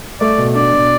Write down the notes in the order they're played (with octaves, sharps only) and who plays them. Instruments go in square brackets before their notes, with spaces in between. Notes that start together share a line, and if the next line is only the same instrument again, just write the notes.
[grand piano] A3 [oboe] D5
[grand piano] B2
[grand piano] D4 [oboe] D5
[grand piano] B2